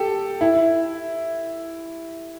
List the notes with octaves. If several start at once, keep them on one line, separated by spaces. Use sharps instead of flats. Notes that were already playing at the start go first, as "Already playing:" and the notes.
Already playing: G4 A4
E4